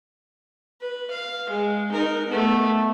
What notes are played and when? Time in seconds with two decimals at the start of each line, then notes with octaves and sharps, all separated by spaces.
0.81 B4
1.11 F5
1.50 G#3
1.92 D#4 A#4
2.27 A3 B3